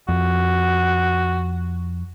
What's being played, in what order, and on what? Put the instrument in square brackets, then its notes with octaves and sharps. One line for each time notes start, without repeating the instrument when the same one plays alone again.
[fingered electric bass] F2 [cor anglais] F#4